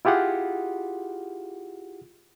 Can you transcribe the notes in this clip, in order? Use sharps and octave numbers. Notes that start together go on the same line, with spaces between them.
E4 F4 G4 G#4 F#5